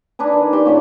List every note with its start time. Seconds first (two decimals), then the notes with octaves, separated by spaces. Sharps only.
0.19 D4 D#4 B4 G#5
0.33 D#3
0.52 D4 G4 C6 C#6
0.65 A#2 C#3 E3 B3